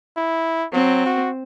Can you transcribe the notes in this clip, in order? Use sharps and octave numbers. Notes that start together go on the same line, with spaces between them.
E4
F#3 C4
F#4